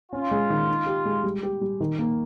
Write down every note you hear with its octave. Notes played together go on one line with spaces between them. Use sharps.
C#4 F4
G#3
D#3
D#4
G4
G#3
G3
G4
G3
D#3
A#3